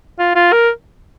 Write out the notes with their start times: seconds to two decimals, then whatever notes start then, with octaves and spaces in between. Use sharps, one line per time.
0.19 F4
0.35 F4
0.52 A#4